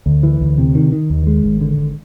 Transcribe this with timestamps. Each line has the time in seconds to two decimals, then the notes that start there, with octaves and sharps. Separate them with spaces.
0.06 D2
0.23 E3
0.41 D2
0.58 C3
0.75 D#3
0.92 D#3
1.10 D#2
1.27 G#3
1.44 G#1
1.61 D3
1.78 G#1